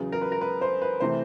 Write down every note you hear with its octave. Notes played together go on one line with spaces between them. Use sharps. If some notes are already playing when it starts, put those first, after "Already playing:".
Already playing: E2 C#3 F#3 B3 G#4
A#4
B4
A#4
B4
C5
B4
C3 E3 A3 C5